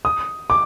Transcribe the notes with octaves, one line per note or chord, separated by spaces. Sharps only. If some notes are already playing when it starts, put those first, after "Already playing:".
D#6
D6